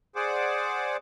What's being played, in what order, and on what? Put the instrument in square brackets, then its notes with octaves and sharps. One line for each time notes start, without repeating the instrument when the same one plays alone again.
[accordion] G#4 C5 D5 F#5 D6